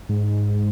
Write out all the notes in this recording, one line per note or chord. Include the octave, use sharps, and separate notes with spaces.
G#2